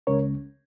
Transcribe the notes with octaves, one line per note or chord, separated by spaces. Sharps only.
C#2 C#3 G#3 C#4 A#4 C#5